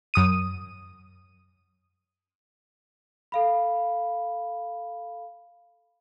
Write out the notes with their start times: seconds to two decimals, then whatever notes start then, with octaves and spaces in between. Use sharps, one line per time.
0.14 F#2 D#6 D#7
3.32 A4 F5 B5